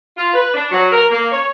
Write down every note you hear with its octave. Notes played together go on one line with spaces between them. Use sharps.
F4
B4
D4
F#3
A#4
A#3
C#5